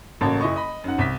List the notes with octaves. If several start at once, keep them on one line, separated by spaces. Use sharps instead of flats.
A1 C#3 A#3 F#4 A4 C#5
F#1 E4 D#5 C#6
D#5 B5
F#2 D#4 F#5
C2 B6